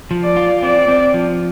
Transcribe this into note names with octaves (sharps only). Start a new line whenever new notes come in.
F3
D5
F4
C4 D5
C4
F3